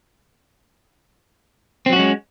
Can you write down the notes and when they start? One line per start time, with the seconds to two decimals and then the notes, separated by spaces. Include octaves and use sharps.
1.86 C4
1.89 F#3
1.93 F#4
1.96 C#4
1.99 G#3